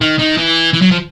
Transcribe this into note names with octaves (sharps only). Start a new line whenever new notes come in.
D#3
D#3
E3
E3
F#3
F3